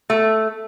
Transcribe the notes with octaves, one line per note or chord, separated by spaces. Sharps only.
A3